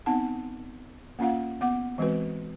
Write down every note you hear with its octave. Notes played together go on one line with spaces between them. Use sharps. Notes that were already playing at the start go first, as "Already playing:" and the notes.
B3 C4 D#4 F#5 A5
A#3 C#4 F4 F5 F#5
B3 F#5 D6
E3 G#3 C4 F#4 B4